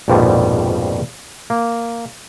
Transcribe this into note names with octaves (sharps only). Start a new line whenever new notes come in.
A#1 F2 G#2 B2 D#3 G3
A#3